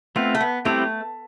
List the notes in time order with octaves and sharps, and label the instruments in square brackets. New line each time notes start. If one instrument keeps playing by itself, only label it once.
[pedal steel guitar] A3 C4 F4 [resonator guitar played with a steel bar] B3
[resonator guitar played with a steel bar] A3
B3
[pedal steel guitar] G3 C4 E4 G4 [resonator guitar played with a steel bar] A3